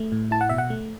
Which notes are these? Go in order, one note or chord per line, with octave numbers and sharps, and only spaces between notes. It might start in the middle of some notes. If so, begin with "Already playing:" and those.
Already playing: A3
A2
E4 A5
F#5
B2 E5
F#5
A3